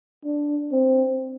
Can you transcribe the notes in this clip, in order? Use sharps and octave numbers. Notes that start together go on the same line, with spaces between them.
D4
C4